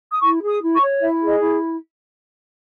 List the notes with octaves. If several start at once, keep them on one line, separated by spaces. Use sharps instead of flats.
D#6
E4 C#6
G#4
D#6
E4
C#6
C#5
E4 E5
G#4
D#5
E4